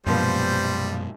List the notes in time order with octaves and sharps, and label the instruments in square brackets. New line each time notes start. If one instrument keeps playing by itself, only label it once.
[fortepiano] A#1 F3 B3 [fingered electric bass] F#2 B2 G#3 [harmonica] G3 C5